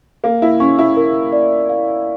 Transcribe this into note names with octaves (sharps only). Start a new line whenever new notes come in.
A#3 F5
E4
C#4 C#6
E4
A#4
D5
F5